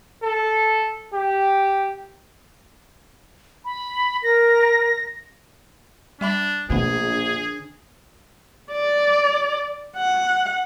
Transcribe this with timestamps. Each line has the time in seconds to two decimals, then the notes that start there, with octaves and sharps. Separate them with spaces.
0.23 A4
1.14 G4
3.65 B5
4.23 A#4 A#6
6.21 G3 D4 E5 B5
6.70 A#1 B2 D3 A3 B3 G#4
8.73 D5
9.97 F#5